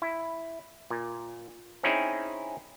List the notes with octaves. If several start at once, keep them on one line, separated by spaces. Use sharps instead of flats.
E4
A#2
C4 C#4 D#4 E4 G#4